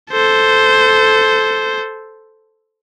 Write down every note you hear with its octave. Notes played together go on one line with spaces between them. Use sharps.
A4 C5